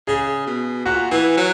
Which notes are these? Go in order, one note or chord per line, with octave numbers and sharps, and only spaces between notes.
C#3 G#4
B2
A#2 F#4
E3
F#3